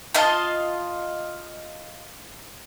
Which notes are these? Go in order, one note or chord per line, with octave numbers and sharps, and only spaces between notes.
F4 D#5 F5 A5